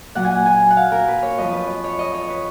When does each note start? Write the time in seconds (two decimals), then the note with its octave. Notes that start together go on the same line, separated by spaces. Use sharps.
0.15 A#2 F#3 F#5
0.25 G#5
0.31 F#5
0.46 G#5
0.71 F#5
0.77 F5
0.92 A#4
1.08 B4
1.23 C#5
1.38 F2 F3 D#5
1.53 B4
1.84 C#5
1.99 D#5
2.14 C#5
2.30 B4